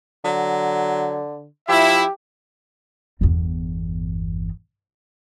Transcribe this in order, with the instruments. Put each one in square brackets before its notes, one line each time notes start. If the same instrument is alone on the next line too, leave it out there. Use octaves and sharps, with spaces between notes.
[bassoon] D3 [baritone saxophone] F#3
[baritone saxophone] F3 [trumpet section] E4 E5 [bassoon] G4
[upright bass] G1 E2